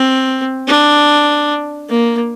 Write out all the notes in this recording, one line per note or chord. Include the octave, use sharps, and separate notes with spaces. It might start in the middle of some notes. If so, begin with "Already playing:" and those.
Already playing: C4
D4
A#3